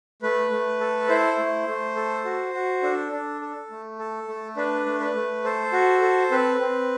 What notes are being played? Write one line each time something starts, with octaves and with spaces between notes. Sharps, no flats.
A3 B4
A3
A4
E4 C5
A3
A3
A4
F#4
F#4
D4 A4
D4
A4
A3
A4
A3
D4 B4
A3
B4
A3
A4 C5
F#4
A4
C4 B4
C4